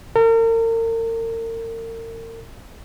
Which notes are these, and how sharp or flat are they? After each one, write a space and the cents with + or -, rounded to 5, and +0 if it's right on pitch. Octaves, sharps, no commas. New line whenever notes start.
A#4 -40